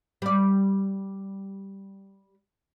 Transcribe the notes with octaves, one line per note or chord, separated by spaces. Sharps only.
G3 D5